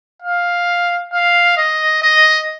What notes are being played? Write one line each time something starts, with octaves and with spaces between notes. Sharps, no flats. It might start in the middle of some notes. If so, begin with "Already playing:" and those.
F5
F5
D#5
D#5